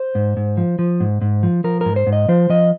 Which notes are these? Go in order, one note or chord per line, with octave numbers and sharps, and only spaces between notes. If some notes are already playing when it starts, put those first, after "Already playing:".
Already playing: C5
G#2
G#2
F3
F3
G#2
G#2
F3
F3 A#4
G#2 A#4
C5
G#2
D#5
F3 C5
F3 D#5